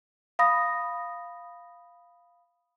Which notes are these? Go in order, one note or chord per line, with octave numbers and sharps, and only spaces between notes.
F5 B5 D#6 A#6